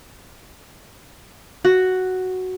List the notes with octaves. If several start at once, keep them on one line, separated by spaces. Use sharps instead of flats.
F#4